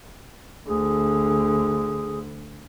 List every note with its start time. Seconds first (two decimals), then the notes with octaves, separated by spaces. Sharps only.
0.68 D2 D3 G#4